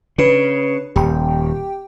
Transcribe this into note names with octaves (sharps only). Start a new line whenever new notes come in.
C#3 D4 B4
D#1 G4 G5